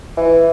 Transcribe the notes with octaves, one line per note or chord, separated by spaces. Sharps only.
E3